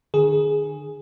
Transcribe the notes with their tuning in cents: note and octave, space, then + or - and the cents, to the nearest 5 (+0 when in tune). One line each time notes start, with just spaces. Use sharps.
D3 +45 G#4 +0